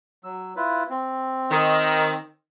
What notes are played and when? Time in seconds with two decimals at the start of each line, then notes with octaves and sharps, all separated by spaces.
0.24 F#3 E6
0.56 E4 F4 B4
0.90 C4
1.51 D#3